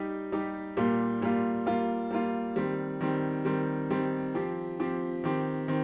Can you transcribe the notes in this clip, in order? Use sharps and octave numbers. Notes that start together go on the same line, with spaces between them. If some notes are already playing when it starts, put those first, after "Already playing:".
Already playing: G3 D#4 G4
G3 D#4 G4
A#2 G3 A#3 F4
A#2 G3 A#3 F4
G3 A#3 F4
G3 A#3 F4
D#3 G3 C4
D#3 G3 C4
D#3 G3 C4
D#3 G3 C4
F3 C4 G4
F3 C4 G4
D#3 C4 G4
D#3 C4